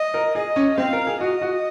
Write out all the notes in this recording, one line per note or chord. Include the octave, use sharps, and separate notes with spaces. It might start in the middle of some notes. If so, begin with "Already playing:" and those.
Already playing: D#5
A#4
G#4 D#5
C#4
C4 F5
A#4
G#4
F#4 D#5
F#4